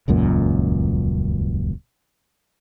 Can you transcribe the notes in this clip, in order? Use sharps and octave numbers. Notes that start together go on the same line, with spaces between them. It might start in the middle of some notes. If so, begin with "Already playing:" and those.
D#1 C#2 F#2 A#2